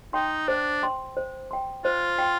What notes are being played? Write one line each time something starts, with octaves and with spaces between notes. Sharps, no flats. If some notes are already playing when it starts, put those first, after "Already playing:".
D#4 G5 C6
D4 C5
G5 C6
C5
G5 C6
F4 C5
G5 C6